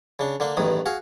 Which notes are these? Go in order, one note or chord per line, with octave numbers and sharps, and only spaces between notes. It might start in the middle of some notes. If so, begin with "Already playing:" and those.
C#3 D4
D3 A#3 D4
A1 E2 G2 D#3 D#6
F#4 G#4 F5